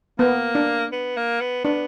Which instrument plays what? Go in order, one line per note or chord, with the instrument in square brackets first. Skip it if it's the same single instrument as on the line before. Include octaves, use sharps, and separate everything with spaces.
[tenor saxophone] A#3 [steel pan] B3
[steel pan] D4
[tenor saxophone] B3
A#3
B3
[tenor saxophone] B3 [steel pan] D4